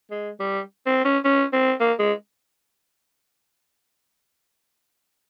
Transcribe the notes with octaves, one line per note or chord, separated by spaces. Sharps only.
G#3
G3
C4
C#4
C#4
C4
A#3
G#3